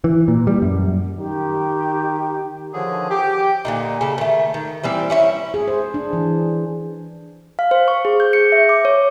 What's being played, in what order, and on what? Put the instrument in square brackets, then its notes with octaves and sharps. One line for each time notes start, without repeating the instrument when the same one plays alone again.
[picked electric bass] E3
A#2
G3
F#2
[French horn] D#3 [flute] G4
[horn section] D3 D#3 F3 G#4 C#5 G#5
G4
[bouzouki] A#2 D3 D#4
C#3 A4
D#3 A3
D#3
E3 G3 C4
C#4 E4 C#5
[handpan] G#4
C5
D4
E3
[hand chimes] F5
C5
C#6
G#4
G6
C#7
E5
D6
C#5